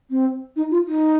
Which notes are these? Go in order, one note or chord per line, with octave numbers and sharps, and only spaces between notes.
C4
D#4
F4
D#4